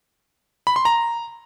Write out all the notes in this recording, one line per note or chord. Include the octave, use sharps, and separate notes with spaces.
B5
C6
A#5